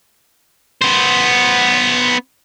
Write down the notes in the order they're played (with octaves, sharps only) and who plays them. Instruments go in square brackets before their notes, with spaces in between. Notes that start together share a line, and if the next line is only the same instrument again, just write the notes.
[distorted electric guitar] B3 C5